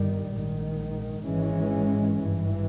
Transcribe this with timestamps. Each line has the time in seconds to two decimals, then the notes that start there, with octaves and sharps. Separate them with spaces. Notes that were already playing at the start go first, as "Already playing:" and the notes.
Already playing: G1 G2 D#3 G3
0.32 A#1 G#2 D#3
1.26 G#1 G#2 E3 G#3 C#4
2.20 G#1 G2 E3